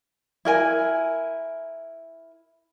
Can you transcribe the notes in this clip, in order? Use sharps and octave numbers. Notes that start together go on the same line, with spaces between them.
E4 A#4 G#5